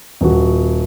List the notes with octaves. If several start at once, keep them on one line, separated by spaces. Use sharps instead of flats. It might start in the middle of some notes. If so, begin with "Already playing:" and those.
D#1 F#4